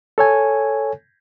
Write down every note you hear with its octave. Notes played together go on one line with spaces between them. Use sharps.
A4 C#5 G#5